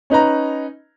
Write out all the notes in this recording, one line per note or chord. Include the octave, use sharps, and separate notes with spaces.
C#4 D#4 B4 A#5